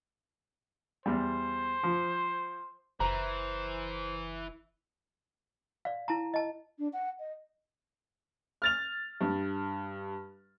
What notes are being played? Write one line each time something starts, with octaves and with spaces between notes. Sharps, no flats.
E2 G3 C5
F3
F#1 E3 C5 A#5
D5 F5
E4 A5 A#5
D#5 A5
D4
F#5
D#5
F6 A6 F7
G2